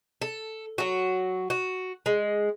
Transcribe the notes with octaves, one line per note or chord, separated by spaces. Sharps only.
A4
F#3 F#4
F#4
G#3